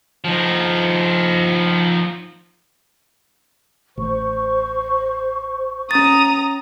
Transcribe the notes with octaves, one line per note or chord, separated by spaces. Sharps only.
F3 D#4
A1 C5 C#6
C#4 A#5 D#6 A6